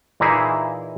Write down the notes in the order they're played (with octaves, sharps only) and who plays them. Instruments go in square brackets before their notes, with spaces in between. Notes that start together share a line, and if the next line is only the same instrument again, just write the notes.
[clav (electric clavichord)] A#2 E3 A#3 D#4 E4 G#4